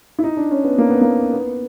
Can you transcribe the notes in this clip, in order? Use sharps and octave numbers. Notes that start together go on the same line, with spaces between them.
E4
D#4
D4
C#4
B3
A#3
B3
A#3
B3